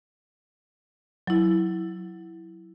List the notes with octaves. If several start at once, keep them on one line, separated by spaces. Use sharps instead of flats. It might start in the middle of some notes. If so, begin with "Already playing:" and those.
F#3 E4